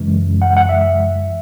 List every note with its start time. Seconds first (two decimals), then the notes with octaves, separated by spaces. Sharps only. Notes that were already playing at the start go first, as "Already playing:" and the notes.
Already playing: F#2 C#3 E3 G#3
0.42 F#5
0.57 F#5
0.69 E5